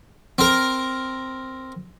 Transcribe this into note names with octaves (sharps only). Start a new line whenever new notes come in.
C4 A#4